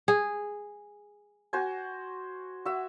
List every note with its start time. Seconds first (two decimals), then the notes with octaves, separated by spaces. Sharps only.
0.08 G#4
1.53 F#4 C5 G#5
2.65 F#4 E5